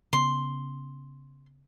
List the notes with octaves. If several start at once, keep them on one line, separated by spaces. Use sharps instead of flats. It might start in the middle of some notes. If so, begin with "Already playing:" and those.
C#3 B3 C6